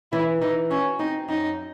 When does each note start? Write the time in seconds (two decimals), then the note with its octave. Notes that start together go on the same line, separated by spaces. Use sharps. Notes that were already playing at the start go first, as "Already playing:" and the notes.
0.12 E3 E4
0.41 E3 D#4
0.70 C#4 F#4
0.99 C4 D#4
1.28 F#2 D#4